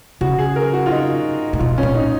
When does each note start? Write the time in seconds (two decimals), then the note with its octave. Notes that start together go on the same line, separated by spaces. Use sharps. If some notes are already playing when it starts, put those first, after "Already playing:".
0.21 C#3 F#4
0.39 G#4
0.56 A#4
0.73 F#4
0.86 F4
0.91 D#4
1.53 A#2
1.59 B2 F4
1.78 C#4
1.83 A#2
1.95 D#4